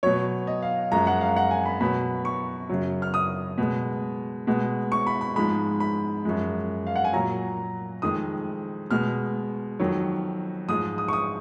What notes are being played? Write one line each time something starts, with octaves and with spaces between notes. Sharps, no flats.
B2 F#3 C#5
D#5
F5
F#2 F3 G#3 A#5
F#5
F5
F#5
G#5
B5
B2 F#3 B5
C#6
F#2 C#3 F#3
F6
D#6
B2 G#3
B2 G#3
C#6
B5
B5
G#2 F3 G#3 B5
B5
F#2 F3 G#3
F5
F#5
G#5
A#2 F#3 A#5
F2 D#3 G#3 D#6
B2 G#3 F6
F2 D#3 F#3
G#2 F3 G#3 D#6
D#6
C#6
D#6